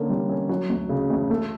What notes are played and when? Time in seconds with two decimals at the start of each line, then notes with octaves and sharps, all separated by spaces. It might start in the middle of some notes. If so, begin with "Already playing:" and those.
Already playing: D3 A#3 C#4
0.10 G3
0.30 C#4
0.49 F#3
0.69 D2
0.89 C#3
1.10 D2
1.30 A3